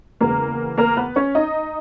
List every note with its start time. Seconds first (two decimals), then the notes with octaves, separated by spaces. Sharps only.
0.21 E2 C#3 G#3 A#3 B3 A#4
0.78 A#3 A#4
0.97 B3 B4
1.16 C#4 C#5
1.35 D#4 D#5